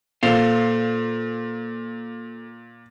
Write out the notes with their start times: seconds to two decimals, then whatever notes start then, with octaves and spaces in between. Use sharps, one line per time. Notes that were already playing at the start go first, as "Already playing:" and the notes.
0.23 A#2 A4 C5 F5